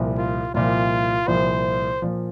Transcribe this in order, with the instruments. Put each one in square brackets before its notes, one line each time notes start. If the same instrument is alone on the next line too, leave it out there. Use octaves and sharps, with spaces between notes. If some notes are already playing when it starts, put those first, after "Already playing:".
Already playing: [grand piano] C2 A#2 F3
[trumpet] F4
[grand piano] C2 A#2 F3 [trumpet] F4
[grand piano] C2 A#2 F3 [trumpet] C5
[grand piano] A#2 F3